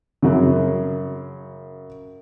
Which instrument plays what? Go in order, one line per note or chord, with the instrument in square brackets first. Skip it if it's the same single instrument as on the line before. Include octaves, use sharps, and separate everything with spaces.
[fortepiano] F#2 C#3